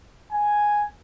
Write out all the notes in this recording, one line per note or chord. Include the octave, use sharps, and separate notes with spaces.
G#5